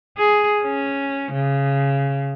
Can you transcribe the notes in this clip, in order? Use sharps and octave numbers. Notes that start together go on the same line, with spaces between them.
G#4
C#4
C#3